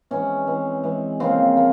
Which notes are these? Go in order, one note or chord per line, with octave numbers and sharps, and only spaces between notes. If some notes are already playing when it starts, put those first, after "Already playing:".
E3 G#3 C4 C#4
E3 G#3 C4
E3 G#3 C4
C#3 F3 A#3 C4
A#3